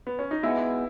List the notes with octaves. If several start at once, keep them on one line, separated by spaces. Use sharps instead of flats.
B3
C#4
D#4
B2 G#3 B3 E4